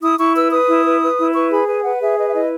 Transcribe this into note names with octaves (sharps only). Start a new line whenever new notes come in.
E4 D#6
E4 C#6
B4 E6
B4 D#6
E4
B4
B4
E4
B4 C#6
G#4 B5
B4 G#5
B4 F#5
G#4 E5
B4 D#5
E5
E4 D#5